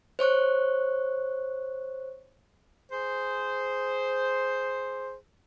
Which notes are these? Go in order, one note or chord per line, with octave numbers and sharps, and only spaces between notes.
C5 C#5 C#6 F#6
G#4 C5